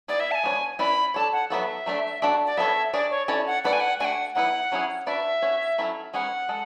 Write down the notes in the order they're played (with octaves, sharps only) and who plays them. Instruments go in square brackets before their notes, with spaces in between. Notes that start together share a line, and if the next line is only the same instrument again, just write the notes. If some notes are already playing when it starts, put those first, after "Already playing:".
[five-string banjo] B3 E4 G#4 [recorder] D5
[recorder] E5
A5
G#5
[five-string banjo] G#3 B3 D4 F#4 C#5
[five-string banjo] C#4 E4 B4 D5 [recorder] B5
[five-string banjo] D4 A4 C#5 [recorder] A5
[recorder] F#5
[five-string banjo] F#3 B3 F#4 A4 [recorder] E5
[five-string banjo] F#3 A3 D4
D4 F#4 A4 D5
[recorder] D5
[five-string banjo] B3 D4 A4 C#5 [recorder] E5
[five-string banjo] D4 G#4 C#5 [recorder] D5
[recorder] C#5
[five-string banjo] C#4 E4 A4 C#5 [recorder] D5
[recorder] F#5
[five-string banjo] A3 E4 B4 D5 [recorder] F#5
[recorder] G#5
F#5
[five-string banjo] A3 D4 F#4 [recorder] F#5 G#5
[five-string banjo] F#3 B3 E4 B4 [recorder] F#5
[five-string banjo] F#3 C#4 E4 G#4
[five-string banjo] D4 F#4 B4 D5 [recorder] E5
[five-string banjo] C#4 F#4 C#5
F#3 C#4 E4 A4
[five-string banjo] G#3 C#4 G#4 B4 [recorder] F#5
[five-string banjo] G#3 A4